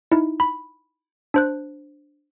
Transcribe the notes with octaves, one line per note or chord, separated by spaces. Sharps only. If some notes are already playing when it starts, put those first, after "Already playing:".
D#4 E4
B5
D4 C5 F#6